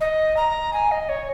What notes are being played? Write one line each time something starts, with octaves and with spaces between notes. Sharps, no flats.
D#5
A#5
G#5
D#5
C#5